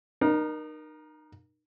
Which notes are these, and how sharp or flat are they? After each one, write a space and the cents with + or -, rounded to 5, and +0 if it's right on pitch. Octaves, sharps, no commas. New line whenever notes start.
D#4 -30 A#4 +20